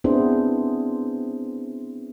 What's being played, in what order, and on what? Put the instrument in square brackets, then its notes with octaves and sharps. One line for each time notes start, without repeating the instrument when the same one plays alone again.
[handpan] B3 C4 D4 E4 G#4 C5